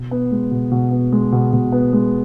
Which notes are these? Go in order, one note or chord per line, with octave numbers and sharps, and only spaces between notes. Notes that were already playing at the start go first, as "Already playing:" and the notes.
Already playing: B2
B3
G#3
B2
B2
B3
G#3
B2
B2
B3
G#3